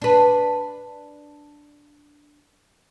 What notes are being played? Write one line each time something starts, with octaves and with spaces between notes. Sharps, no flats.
D4 B4